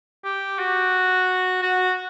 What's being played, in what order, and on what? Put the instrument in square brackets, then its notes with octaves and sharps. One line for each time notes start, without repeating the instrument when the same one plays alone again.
[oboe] G4
F#4
F#4